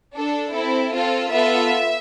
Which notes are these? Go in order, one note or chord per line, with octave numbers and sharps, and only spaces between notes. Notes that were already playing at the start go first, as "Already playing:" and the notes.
D4 A4
C4 E4 A4
C4 F4 A4
B3 F4 A4 E5